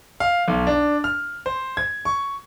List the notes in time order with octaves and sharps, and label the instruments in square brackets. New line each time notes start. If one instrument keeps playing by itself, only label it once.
[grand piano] F5
B1
D4
F6
C5
G#6
C#6